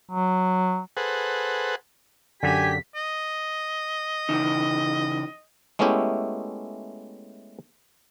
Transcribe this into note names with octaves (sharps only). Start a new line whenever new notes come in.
F#3
G#4 A4 B4 C5 F#5
F#2 D3 G4 G#5 B6
D#5
C#3 E3 D#4
G#3 A3 B3 C#4 E4 G4